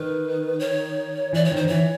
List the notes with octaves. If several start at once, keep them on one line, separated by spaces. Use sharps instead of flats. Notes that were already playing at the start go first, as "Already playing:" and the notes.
Already playing: D#3 B4
C#5
E3 D5
C#5
D#3
C5
D#3
E3 C#5